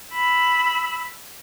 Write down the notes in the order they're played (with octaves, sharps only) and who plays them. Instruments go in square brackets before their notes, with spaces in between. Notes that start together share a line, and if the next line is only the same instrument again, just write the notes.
[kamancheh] B5 E6